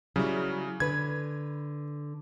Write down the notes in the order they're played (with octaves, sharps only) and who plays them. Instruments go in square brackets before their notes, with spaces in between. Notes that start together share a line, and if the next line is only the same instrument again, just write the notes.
[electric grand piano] C#3 [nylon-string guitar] F#3 G3 E4
[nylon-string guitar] D3 B4 [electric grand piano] G#6